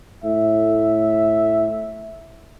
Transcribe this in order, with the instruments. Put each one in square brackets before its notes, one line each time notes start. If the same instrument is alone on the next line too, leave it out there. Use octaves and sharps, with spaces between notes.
[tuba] A2 [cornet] E5